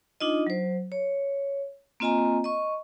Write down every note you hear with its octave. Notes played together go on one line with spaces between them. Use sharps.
D4 D#4 F4 D#5
F#3 C5
C#5
A#3 C4 F4 D#5 G#5 A#5
D#5 C#6